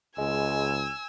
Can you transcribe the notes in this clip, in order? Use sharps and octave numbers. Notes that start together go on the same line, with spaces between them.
C#2 G#3 G#5 E6